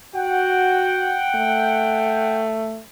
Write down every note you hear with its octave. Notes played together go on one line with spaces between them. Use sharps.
F#4 F#5 G5
A3